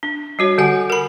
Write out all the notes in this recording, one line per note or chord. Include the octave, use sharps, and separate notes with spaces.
D4
G3 F#4 C#5
D3 G3 F#4 G4 F#5 G#5
A#4 B5